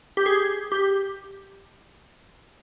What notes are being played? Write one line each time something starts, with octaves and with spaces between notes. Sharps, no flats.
G4
G#4
G4